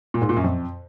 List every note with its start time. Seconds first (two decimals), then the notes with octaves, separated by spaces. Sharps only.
0.14 A#2
0.22 G#2
0.29 A#2
0.37 F#2
0.44 F2